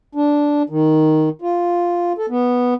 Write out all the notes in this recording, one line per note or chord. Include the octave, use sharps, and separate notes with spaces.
D4
D#3
F4
A4
B3